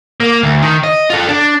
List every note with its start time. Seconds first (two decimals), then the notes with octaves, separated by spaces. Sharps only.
0.20 A#3
0.43 D2
0.62 D#3
0.84 D#5
1.10 F4 A4
1.28 D4